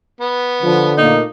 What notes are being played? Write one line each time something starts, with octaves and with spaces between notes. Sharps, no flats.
B3
D3 F3
A#2 A3 A#3 D#4